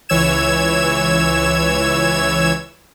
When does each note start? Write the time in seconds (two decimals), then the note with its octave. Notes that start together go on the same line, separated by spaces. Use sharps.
0.09 C#2 E3 C#5 E6 G#6 E7